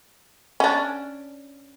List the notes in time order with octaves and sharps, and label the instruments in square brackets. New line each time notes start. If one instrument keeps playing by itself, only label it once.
[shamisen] C#4 D4